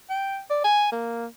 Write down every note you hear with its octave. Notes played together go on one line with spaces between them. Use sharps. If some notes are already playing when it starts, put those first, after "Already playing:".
G5
D5
G#5
A#3